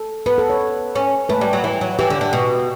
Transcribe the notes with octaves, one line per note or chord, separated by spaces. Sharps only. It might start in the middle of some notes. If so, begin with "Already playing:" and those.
Already playing: A4
B3 B4
A4
C#5
C#4
A3 B4
G3
F#3
E3
F#3
E3 G4
D3
D3
B2